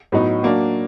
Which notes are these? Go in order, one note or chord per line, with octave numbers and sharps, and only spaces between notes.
A2 F#3 B3 D#4
F#3 A#3 D4